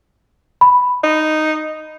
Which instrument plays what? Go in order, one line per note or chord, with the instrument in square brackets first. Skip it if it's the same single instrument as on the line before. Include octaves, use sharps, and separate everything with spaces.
[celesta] B5
[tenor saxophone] D#4